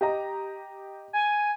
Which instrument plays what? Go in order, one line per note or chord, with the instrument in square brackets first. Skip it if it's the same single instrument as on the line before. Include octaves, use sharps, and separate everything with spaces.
[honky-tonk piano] G4 D#5 A#5
[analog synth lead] G#5